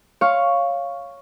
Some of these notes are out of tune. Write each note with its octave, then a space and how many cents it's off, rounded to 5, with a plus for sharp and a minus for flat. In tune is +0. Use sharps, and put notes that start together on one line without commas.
C#5 +0 F5 +0 C#6 +0